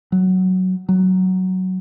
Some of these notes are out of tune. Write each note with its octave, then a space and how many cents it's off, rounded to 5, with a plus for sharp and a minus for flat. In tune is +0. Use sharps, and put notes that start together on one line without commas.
F#3 +5
F#3 +10